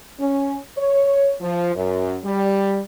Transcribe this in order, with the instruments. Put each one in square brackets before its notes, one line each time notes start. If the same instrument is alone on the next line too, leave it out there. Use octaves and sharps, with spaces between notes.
[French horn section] C#4
C#5
F3
F#2
G3